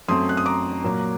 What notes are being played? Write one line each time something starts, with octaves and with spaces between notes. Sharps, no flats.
F#2 F#3 A3 C4 C6 D#6
F#6
D#6
A#5 D6
A#2 F#3 A#3